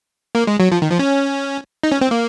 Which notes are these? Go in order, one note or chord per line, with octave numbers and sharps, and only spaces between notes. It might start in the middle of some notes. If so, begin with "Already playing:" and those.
A#3
G#3
F#3
F3
D#3
F3
C#4
D#4
C#4
C4
A#3